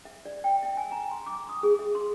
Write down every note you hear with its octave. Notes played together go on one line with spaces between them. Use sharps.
E5
D5
G5
E5
G#5
A#5
C6
D6
D#6
G#4
E5
C6